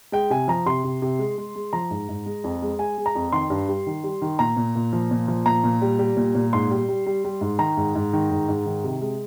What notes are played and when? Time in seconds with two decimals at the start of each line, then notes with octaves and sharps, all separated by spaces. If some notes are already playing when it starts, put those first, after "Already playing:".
0.12 G#3 G5
0.30 C3 G#5
0.48 F3 A#5
0.66 C3 C6
0.84 C3
1.02 C3
1.19 G#3
1.38 G#3
1.56 G#3
1.73 F3 A#5
1.91 G#2
2.09 G#2
2.26 G#3
2.44 F2
2.62 G#3
2.79 G#3 G#5
2.98 G#3
3.06 A#5
3.15 F2
3.32 D#3 C6
3.50 G2
3.69 G3
3.87 D#3
4.04 G3
4.22 D#3
4.39 A#2 A#5
4.57 A#2
4.76 A#2
4.93 F3
5.11 A#2
5.28 F3
5.46 A#2 A#5
5.64 A#2
5.82 G3
5.99 G3
6.17 A#2
6.35 A#2
6.53 G#2 C6
6.71 G3
6.89 G3
7.06 G3
7.24 G3
7.41 G#2
7.59 D#3 A#5
7.77 G#2
7.95 G#2
8.13 D#3
8.31 G#2
8.48 G#2
8.66 D#3
8.84 C3
9.01 G#3